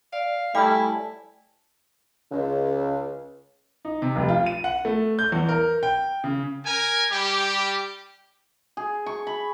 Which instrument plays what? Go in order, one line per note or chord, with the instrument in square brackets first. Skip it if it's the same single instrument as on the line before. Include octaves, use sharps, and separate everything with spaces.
[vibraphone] D5 [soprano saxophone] F5
[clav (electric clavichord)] G3 [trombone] A3 [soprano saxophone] E4 [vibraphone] G#5 A5
[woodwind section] C#2 [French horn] C#3
[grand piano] D#4
C3
F1
F4
D#7
F#5
A3
G6
E2
A#4
G5
C#3
[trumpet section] A#4 G#5
G3 G4
[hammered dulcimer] G#4
C#6
B5